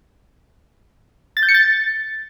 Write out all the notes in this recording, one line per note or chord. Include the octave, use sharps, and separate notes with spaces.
A6
G6
C#7
A6